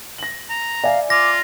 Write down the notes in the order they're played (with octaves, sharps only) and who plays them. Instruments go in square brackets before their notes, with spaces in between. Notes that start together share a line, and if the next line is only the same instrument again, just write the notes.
[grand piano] A#6 F#7
[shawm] A#5
[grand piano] D5 E5 G#5 [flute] F5
[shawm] F4 [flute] D6 [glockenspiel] A#6